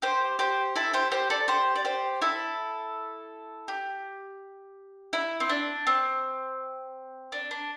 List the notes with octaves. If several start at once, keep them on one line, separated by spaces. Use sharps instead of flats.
G4 C5
G4 C5
E4 A4
G4 C5
G4 C5
A4 D5
G4 C5
D5
G4 C5
E4 A4
G4
E4
C4
D4
C4
D4
D4